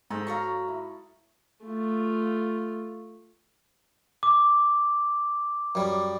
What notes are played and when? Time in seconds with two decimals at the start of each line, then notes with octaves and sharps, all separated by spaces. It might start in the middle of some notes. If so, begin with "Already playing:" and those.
0.10 G#2 A4
0.27 F#3 A4 F5 A#5 C#6 D#6
0.68 E4
1.65 A3 F4
4.23 D6
5.75 F#2 G3